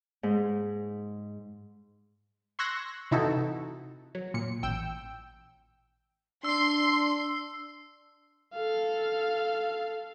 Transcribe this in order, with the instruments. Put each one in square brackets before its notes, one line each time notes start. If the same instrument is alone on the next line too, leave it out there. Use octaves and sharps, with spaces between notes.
[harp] G#2
[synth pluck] C6 C#6 E6 F#6 G#6 A#6
C3 E3 D#4 E4 F#4 A4
F#3
A#2 C#7
A1 G5 E6
[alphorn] D4 [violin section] C6 [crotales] E6 C7
[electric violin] A4 F5